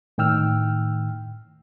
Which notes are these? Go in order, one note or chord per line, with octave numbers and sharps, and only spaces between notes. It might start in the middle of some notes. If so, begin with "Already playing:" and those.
A2 D#3 G5 E6 F6